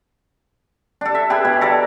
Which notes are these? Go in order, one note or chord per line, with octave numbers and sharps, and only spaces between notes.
D4 A4
E5
G4 G#4 B4 G#5
B2
A4 A#4 D5